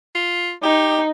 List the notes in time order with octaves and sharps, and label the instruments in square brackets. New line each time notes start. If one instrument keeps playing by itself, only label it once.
[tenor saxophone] F4
[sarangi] D#4 [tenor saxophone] G4